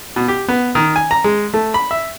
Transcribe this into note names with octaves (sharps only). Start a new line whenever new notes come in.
B2
G4
B3
D#3
G#5
A#5
G#3
A3
B5
E5